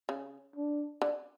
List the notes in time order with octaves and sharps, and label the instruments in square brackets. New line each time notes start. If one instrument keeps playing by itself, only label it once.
[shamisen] C#3
[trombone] D4
[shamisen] D3